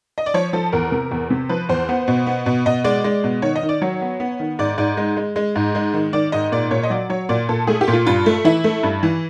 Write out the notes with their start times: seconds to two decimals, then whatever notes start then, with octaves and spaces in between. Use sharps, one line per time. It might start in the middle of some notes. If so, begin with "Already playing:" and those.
0.18 D#5
0.26 D5
0.34 F3 C#5
0.53 F3 A4
0.72 E2 A#4
0.92 C3
1.11 E2
1.30 C3
1.49 F3 B4
1.69 E2 C5
1.89 B3
2.08 B2
2.26 B3
2.46 B2
2.66 B2 D#5
2.84 G#3 D5
3.04 G#3
3.24 B2
3.42 D#3 C#5
3.55 D#5
3.63 D#3
3.69 D5
3.81 F#3 C#5
4.01 B3
4.20 B3
4.40 D#3
4.59 G#2 D5
4.78 G#2 D5
4.97 G#3
5.17 G#3
5.36 G#3
5.55 G#2
5.75 G#3
5.93 D#3
6.13 D#3 D5
6.32 G#2 D#5
6.52 A#2 D5
6.71 A#2 C#5
6.83 D#5
6.90 F#3 D5
7.09 F#3 C#5
7.29 A#2 D5
7.49 A#2 A4
7.67 A3 G#4
7.81 G4
7.88 A#2
7.93 F4
8.06 G2 F4
8.26 A3
8.44 E3 E4
8.64 A3
8.83 G2
9.03 E3